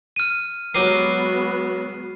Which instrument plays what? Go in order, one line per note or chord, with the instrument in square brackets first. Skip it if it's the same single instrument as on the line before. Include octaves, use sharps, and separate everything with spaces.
[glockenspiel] F6 D#7
[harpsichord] F#3 G4 A#4 [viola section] G#3 B3 F#4 [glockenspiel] C7 D#7